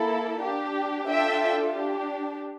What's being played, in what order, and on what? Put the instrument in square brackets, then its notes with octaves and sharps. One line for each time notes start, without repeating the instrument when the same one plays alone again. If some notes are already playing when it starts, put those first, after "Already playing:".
Already playing: [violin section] A#3 E4 A4
D4 G4
D4 F4 A4 E5 G5
D4 G4